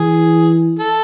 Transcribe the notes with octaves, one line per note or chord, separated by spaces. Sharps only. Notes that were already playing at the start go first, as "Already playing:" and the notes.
Already playing: E3 G#4
A4